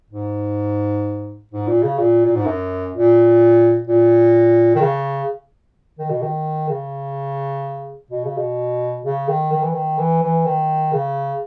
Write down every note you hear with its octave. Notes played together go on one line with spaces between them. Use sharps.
G#2
G#2
A#2
C#3
A#2
A#2
G#2
F#2
A#2
A#2
D#3
C#3
D#3
B2
D#3
C#3
B2
C#3
B2
C#3
D#3
D#3
E3
D#3
E3
E3
D#3
C#3